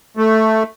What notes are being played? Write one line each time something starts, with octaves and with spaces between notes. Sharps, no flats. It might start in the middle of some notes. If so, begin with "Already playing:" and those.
A3